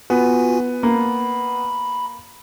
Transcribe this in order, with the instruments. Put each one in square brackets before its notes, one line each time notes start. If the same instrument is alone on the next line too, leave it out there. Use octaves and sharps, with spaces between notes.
[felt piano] B3 [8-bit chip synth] F4 F#4 G#5
[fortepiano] A#3 [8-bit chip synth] B5